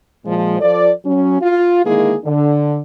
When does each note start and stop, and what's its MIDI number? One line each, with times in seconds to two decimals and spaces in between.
0.25 0.59 46
0.25 0.59 53
0.25 0.59 56
0.60 0.91 53
0.60 0.91 65
0.60 0.91 69
0.60 0.91 74
1.05 1.38 54
1.05 1.38 61
1.41 1.85 65
1.85 2.15 50
1.85 2.15 51
1.85 2.15 56
1.85 2.15 58
1.85 2.15 64
1.85 2.15 68
2.25 2.80 50